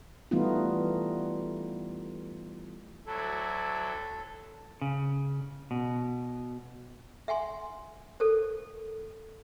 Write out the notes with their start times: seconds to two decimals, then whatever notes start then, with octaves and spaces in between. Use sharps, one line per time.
0.31 E3 G3 A3 B3 D#4 F4
3.06 D2 F#3 E4 A4
4.81 C#3
5.71 B2
7.28 E5 F#5 G#5 C6
8.20 A4 A#4 C5